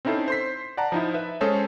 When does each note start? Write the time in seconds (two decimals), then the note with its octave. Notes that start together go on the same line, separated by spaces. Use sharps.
0.05 C4 C#4 D#4 E4 A4 C5
0.28 C5 C6 B6
0.77 D5 F#5 A5 A#5
0.92 F3 D#4 E4
1.14 B4 E5
1.41 G#3 C#4 G#4 A4 C5 C#5